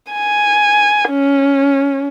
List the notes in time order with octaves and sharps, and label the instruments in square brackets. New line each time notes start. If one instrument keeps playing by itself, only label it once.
[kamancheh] G#5
C#4